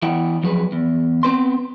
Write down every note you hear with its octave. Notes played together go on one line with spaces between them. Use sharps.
E3 B3 E4 F#5 G5
F2 F3 F#3 G#4 B4
E2
B3 C4 B4 C6